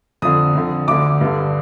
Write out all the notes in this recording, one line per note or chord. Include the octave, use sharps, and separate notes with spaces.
F2 D3 D#6
F2 D3
D2 D3 D6
G2 D3